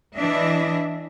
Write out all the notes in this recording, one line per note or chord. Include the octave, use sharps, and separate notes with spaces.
E3 D4 D#5 E5